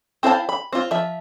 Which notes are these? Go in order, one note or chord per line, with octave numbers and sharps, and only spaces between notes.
C4 E4 C5 F5 A5
B5
C4 F4
F3 E5